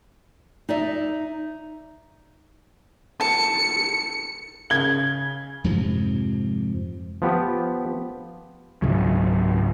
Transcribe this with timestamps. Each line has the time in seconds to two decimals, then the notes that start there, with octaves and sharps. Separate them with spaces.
0.69 D#4 D5 E5
3.21 A5 C#7
4.70 C#3 G#6 G7
5.64 F2 G#2 C3 F3
7.22 F3 B3 G4
8.82 C#2 G#2 C#3 F#3